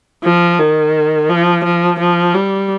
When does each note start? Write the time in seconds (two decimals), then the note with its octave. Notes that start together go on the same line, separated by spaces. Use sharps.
0.24 F3
0.59 D#3
1.29 F3
1.65 F3
2.00 F3
2.35 G3